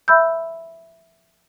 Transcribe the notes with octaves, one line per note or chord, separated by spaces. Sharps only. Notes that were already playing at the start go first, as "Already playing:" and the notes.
E5 B5 E6 G6